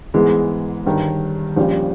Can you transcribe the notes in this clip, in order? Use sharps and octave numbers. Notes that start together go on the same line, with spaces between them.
G#2 E3 G#3 B3
G1 G2 D#3
A#1 A#2 G3 C#4